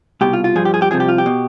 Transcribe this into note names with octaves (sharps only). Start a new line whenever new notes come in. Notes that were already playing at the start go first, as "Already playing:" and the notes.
C2 B2 G4
F4
F4
G2 F3 G#4
G4
G#4
G4
C2 C3 F3 G#4
G4
F4
G4
B2